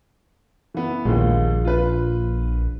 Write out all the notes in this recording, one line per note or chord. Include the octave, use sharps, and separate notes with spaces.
E3 B3
A#1 D#2 G#3
F4 B4